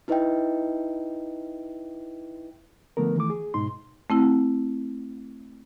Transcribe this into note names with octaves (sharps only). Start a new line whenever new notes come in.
D#4 E4 B4 D#5 E5 G5
D3 F3 A3 B3 A#4
D#3 E3 A3 D6
G#4
G#2 B2 D#4 C6
A3 C4 E4